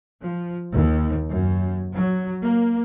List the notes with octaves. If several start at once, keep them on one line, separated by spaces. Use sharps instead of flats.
F3
D#2
F#2
F#3
A#3